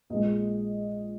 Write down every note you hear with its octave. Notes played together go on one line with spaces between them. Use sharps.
A#1 A#2 G#3 D#5